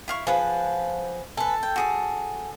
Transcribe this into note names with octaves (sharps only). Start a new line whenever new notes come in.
E4 F5 C#6
F3 G#4 B4 F#5
A4 B4 G#5
G5
F#4 G#4 A5